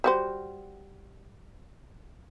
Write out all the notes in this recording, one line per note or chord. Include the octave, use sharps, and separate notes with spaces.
G3 F#4 C5